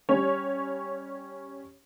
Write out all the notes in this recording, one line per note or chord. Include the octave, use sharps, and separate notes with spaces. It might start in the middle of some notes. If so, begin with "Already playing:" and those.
G3 C#4 C#5